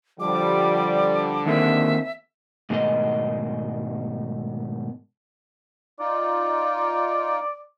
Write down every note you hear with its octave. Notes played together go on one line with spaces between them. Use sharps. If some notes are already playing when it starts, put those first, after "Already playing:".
D3 F3 G3 D6
D#3 A#3 C4 E5
G#2 B2 D#3 G#3 A3 D#5
D#4 F4 D5